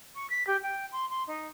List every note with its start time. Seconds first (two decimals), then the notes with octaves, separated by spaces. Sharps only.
0.16 C#6
0.30 B6
0.47 G4
0.63 G5
0.92 C6
1.10 C6
1.28 D#4